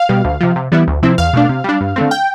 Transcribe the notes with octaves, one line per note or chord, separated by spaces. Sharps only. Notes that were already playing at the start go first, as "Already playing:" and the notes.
Already playing: F5
B2 G3
D2
C3 F3
C3
E3 G3 B3 E4
D2
C3 F3 C4 E4
E2 F5
B2 A3 D4
C3
G3 D4
G2
D3 A3 C4
G5